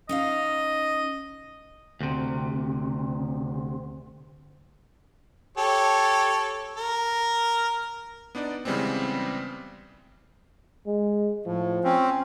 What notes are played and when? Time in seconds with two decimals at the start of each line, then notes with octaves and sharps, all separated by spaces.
0.09 C#4 D#4 D#5 F5
2.00 D2 C3
5.58 G4 A4 C#5
6.77 A#4
8.35 B3 D4 D#4 D5
8.65 C#3 E3 G3 G#3 B3 C4
10.86 G#3
11.46 A2 F3
11.84 C4 C#4